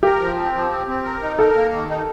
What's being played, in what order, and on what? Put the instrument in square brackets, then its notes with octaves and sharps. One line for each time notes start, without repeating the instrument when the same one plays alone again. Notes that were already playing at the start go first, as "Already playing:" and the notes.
[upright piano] G4 [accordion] A#4
[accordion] F3
C4
F3
C4
C4
A#4
D#4
[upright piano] A4 [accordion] A#4
[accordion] A#3
D#3
D#4